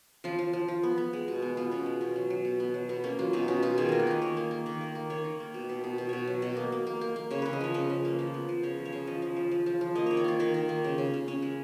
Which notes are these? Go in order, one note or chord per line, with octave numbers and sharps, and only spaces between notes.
F3 F4
F3
F3
F3
B3
B3
G#3
B2
B3
B3 F4
B2 C#4
G#3
B2 C#4
F#3
F#3
B2
B3
F#3
B2 B3
A#3 C#4
F#3 F4
B2 D#4
B2 C#4
B2 F4
D#3 G#4
A#3 A#4
B4
A#3 D#5
D#3 C#5
A#3
A#3
D#3
A#3
A#3
D#3 C#5
D#3
A#3
B2
B2
B2
B2
B2 C#5
F#3
B2 D#5
A#3
A#3
A#3
A#3
A#3
C#3 C#5
C#3 B4
D#5
F3 C#5
C#3 B4
C#3
A#3
F3
B3
F3
C#3 C#5
F3
C#5
C#3
F3 D#5
F3
F3
F3
F3
F3
A#3 D#5
D#3 C#5
C#5
A#3 F4
D#3 D#4
D#3
A#3
C#3
C#3
C#3
C#3 C#4
G#3